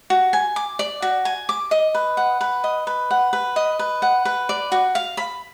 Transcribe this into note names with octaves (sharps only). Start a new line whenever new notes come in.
F#4
G#5
D6
D5
F#4
G#5
D6
D#5
B4
F#5
B4
D#5
B4
F#5
B4
D#5
B4
F#5
B4
D5
F#4
F5
B5